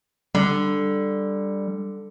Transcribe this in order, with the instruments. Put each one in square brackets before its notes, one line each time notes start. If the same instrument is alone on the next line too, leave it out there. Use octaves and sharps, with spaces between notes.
[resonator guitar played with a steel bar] D3 [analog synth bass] G3